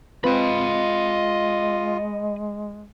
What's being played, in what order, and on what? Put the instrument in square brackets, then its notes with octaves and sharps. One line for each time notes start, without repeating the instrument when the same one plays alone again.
[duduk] G#3 [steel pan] C4 B4 [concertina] F4 [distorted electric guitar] D#5 B5